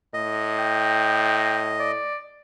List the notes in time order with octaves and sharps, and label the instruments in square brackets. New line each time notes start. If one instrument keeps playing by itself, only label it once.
[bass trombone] A2 [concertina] D#5
[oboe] G5
D5